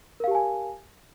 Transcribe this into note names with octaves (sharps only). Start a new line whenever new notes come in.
G4 A#4 F5 G#5 A5